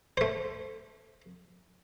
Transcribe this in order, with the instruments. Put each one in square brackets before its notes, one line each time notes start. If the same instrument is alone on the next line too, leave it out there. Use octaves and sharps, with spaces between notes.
[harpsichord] A3 C5